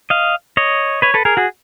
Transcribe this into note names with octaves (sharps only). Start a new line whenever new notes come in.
D#5 F5
C#5 D#5
B4 C#5
A4 B4
G#4 A#4
F#4 G#4